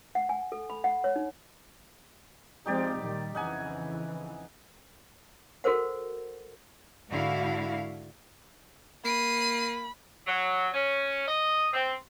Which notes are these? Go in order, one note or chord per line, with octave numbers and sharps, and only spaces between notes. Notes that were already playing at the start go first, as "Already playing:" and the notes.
F#5
G#5
A4
B5
F#5
C#5
D#4
F3 G#3 C4 D#4 G4 D5
A#2 D#3 G3
F2 C#3 E3 D#4 F#5 G#5
F#4 A4 A#4 C5 F#5
G#2 D3 E4 F#4 F5
A#3 B5 C7 D#7
F#3
C#4
D#5
C4